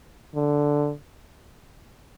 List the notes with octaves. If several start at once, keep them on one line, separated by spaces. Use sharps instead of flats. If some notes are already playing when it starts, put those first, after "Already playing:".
D3